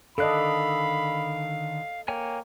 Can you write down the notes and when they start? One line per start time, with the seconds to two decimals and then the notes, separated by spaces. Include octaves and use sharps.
0.18 D3 D#3 A4 D5 D#5 F5 B5 F#6
2.08 A#3 C#5 G5 G#5